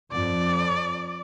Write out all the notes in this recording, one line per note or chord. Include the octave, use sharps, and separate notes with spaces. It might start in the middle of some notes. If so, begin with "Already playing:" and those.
F2 D5